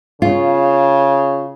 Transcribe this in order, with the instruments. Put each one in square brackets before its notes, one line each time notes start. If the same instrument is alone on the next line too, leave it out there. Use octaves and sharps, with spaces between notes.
[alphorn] C#3 [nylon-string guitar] F4